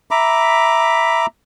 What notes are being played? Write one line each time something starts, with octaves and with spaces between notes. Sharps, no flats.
E5 A#5 B5 D6